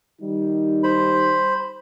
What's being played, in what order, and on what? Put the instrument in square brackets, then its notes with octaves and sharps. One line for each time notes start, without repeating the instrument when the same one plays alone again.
[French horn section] D#3 G3 D#4
[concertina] C5 B5